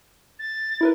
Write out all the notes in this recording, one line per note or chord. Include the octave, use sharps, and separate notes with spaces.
A6
E4 A#4 B4